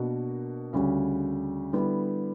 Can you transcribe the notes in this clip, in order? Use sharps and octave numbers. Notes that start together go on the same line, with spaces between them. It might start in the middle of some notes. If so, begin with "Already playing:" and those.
Already playing: B2 A#3 D4 F#4
D2 C#3 G3 C#4 F#4
D3 G3 B3 E4